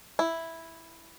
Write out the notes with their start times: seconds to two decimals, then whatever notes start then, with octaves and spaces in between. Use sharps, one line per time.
0.19 E4